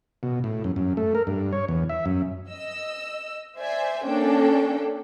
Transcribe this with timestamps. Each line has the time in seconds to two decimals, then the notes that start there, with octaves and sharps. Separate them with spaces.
0.23 B2
0.44 A2
0.64 F#2
0.76 F#2
0.97 A3
1.15 A#4
1.27 G2
1.53 C#5
1.68 E2
1.89 E5
2.06 F#2
2.49 D#5 E6
3.58 C5 D5 E5 G#5
4.05 A#3 C#4 D4 A4 G5